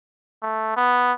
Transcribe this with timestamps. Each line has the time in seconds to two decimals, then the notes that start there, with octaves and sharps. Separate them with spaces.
0.42 A3
0.77 B3